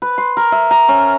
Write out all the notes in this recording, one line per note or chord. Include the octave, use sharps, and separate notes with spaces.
B4
C6
A#4
E5
A#5
C#4